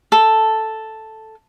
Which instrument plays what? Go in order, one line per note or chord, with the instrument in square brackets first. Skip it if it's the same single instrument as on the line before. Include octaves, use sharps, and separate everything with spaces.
[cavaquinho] A4